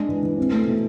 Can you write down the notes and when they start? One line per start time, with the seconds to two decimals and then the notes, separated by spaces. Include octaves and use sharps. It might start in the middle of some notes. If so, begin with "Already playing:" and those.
Already playing: G#3 D4
0.09 E3
0.23 E3
0.38 C4
0.52 A3
0.66 B2